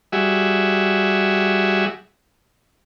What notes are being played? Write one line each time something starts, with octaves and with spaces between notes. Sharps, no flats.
G3 F#4 G#4 E5